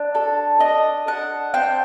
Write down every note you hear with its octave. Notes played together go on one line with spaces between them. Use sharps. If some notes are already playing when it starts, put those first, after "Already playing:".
Already playing: D4
A4
D4 D#5
D4 F#5
C4 G5